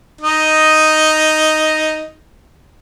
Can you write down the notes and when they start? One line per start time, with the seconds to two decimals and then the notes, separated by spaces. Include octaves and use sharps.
0.21 D#4 D#5